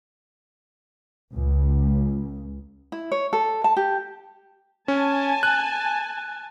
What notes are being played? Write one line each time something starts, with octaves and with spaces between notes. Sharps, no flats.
C#2
E4
C#5
A4
A5
G4
C#4 G#5 A5
F#6